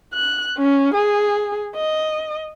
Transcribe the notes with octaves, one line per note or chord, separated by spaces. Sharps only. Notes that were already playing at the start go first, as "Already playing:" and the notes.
F#6
C#4
G#4
D#5